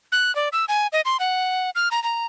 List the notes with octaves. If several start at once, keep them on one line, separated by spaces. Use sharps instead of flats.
F#6
D5
E6
G#5
D#5
C6
F#5
F6
A#5
A#5